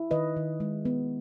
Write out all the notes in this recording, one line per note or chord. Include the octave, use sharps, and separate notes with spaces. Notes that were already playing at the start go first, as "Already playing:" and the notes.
Already playing: E4
D#3 B4 D#5
D#3
G#3
B3